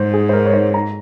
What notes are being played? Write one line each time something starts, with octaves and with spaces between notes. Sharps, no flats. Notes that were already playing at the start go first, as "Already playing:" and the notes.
Already playing: G#2 C5
G#4
C5
A#4
C#5
C5
A#5